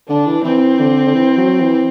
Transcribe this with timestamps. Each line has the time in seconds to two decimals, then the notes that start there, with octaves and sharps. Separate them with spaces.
0.09 D3 D4
0.27 E3
0.44 E3 C4
0.79 D3
1.06 D3
1.14 E3
1.38 F#3
1.60 E3